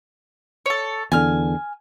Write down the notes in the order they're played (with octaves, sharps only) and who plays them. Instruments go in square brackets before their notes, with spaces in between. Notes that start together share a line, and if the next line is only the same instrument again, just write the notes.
[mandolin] A4 C#5
[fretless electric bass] E2 D3 [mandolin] G#5 F6